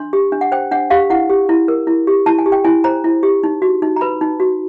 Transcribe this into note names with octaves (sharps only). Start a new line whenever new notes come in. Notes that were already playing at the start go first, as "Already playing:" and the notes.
Already playing: D4 C6
G4
D4
F#5
C5 G5
D4 F#5
G4 F5
E4 F#5
G4
E4
A#4
E4
G4
E4 A5
G#5
G4
G5
E4 G#5
C5 A#5
E4
G4
D#4
F#4
D#4
A#5
B4 B5
D#4
F#4